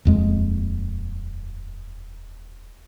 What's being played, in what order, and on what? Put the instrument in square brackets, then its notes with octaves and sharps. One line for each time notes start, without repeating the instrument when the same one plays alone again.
[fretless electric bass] D#1 F2 G#3